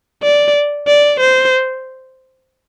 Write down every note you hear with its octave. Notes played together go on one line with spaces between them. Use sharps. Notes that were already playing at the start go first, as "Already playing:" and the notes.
D5
D5
C5